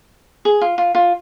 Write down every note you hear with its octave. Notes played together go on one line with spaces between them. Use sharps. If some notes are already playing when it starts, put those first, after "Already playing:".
G#4
F4
F4
F4